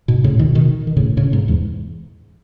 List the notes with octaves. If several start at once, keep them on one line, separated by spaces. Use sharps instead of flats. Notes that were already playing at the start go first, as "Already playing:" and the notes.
G#2 B2
A2 C#3
B2 D#3
B2 D#3
D#3
A2 C#3
A2 C#3
G#2 B2
E2 G#2